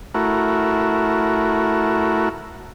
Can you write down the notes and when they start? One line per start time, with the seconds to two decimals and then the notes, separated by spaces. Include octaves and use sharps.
0.15 A3 E4 F#4 A#4